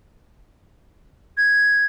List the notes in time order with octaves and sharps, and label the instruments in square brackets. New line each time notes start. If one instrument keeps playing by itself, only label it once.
[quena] G#6